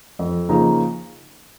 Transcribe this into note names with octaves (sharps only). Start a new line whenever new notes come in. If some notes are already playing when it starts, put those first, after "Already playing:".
F2
C#3 F3 A#3 D#4